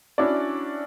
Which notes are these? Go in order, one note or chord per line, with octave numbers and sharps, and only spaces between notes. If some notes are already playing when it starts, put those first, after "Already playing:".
C#4 D4 E4 F#4 D5